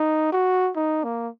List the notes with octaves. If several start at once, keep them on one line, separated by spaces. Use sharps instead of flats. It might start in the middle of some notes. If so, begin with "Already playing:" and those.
Already playing: D#4
F#4
D#4
A#3